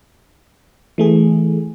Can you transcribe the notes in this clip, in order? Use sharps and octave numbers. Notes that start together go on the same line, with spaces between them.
E3 A3 G#4